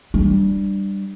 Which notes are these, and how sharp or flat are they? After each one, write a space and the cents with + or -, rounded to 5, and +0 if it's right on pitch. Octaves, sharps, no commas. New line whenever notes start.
G3 +0 D4 +15